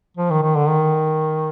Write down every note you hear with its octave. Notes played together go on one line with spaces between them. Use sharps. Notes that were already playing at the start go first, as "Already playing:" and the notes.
F3
D#3
D#3
D3
D#3